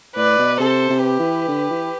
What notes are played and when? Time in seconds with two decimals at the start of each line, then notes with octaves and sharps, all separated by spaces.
0.15 A2 B4 D5
0.38 B2
0.59 C3 A4 C5
0.90 C3
1.04 G4 B4
1.19 E3
1.48 D3
1.70 E3